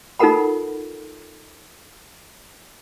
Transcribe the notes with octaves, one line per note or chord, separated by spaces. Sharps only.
D#4 F4 A4 A#4 F#5 B5